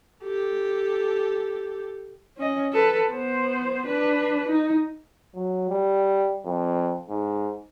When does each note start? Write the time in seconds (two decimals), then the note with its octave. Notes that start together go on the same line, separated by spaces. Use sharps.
0.25 G4 A4
2.37 C#4 D#5
2.73 A4 B4
3.09 B3 C5
3.86 D4 B4
4.48 D#4
5.35 F#3
5.69 G3
6.45 F2
7.09 G#2